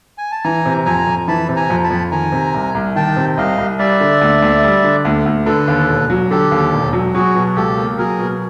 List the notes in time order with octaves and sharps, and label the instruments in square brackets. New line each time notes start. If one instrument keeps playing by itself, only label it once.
[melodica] G#5
A5
[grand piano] E3 [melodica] G#5 A#5
[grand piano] C3
[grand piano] F2 [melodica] G#5 A#5
[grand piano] F2
[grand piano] E3 [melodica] A5 B5
[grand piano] C3
[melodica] G#5 A#5
[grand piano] F2
[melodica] A5 B5
[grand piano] F2
[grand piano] D#3 [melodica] G#5 A#5
[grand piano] C3
C2
C2
[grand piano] D#3 [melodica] G5 A5
[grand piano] C3
[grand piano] C2 [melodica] D#5 F5
[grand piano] C2
[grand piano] G3 [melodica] D5 E5
[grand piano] D3
D2
D2
G3
D3
D2
D2
[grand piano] D3 [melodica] A4 B4
[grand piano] D#2
E1
F#3
[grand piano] D3 [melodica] G4 A4
[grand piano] D#2
E1
F#3
[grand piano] F#3 [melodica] F#4 G#4
[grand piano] B2
[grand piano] C#2 [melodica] G4 A4
[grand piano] A#3
[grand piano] F#3 [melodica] G#4 A#4
[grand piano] B2